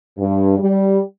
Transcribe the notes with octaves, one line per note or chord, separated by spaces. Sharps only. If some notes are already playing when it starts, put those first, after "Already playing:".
G2
G3